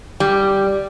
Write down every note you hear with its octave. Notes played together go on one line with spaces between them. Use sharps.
G3